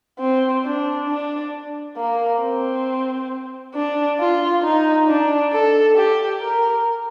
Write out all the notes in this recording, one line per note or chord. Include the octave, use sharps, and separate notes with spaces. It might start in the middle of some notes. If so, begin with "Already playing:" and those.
C4
D4
D4
A#3
C4
D4
F4
D#4
D4
A4
G4
A#4